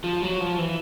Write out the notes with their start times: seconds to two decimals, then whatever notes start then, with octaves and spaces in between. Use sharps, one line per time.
0.04 F3
0.22 F#3
0.40 F3
0.58 E3